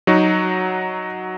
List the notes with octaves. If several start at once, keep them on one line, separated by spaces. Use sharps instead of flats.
F#3 D#4 F#4